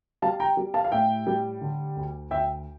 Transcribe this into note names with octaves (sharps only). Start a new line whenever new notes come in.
G3 F5 A5
G5 A#5
G3
F5 A5
F5
A2 E5 G5
G3
D3
D2
D2 E5 G5